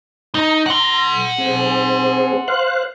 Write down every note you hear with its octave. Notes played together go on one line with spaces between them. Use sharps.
D#4 A#5
F#5 C6
C4 G#4
C5 F5 F#6